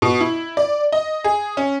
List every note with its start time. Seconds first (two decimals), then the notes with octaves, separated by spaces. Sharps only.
0.02 B2
0.21 E4
0.57 D5
0.92 D#5
1.24 G#4
1.57 C#4